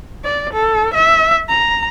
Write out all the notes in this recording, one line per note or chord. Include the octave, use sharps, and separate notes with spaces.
D5
A4
E5
A#5